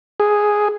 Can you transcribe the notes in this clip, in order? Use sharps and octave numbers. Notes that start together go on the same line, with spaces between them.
G#4